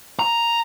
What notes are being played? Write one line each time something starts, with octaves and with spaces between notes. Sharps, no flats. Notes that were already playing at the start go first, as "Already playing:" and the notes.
A#5